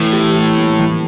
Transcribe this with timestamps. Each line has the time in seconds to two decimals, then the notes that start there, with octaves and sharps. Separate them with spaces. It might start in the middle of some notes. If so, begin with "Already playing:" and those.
Already playing: A2 E3
0.13 G4
0.35 E4
0.57 A#3
0.79 E3